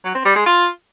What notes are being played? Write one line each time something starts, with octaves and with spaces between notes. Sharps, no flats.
F#3
C4
G3
G#3
F4